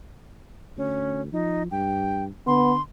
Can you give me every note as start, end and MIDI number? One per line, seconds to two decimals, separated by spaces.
0.77 1.31 38
0.77 1.21 61
1.32 1.68 53
1.32 1.63 63
1.71 2.28 43
1.71 2.24 79
2.47 2.79 50
2.47 2.73 59
2.47 2.82 84